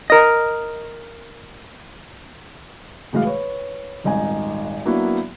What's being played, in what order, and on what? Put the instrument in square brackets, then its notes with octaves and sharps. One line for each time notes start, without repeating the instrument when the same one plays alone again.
[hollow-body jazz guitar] A#4 D#5
[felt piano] A2 E3 G#3 F#4 F5
B4 C#5
D#1 G#1 D#4 G#5
F#3 A#3 B3 D4 E4 F#4